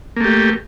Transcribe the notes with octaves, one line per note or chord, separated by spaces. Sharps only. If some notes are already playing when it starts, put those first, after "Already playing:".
A3 A#3 G4